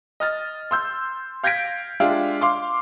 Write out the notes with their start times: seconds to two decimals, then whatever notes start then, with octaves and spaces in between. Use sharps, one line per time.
0.20 D#5 F6 A6
0.71 C6 E6 G6
1.43 F5 G6 G#6 A#6 B6 D7
2.00 G#3 D4 F4 G4 E5 F5
2.41 F5 C6 D6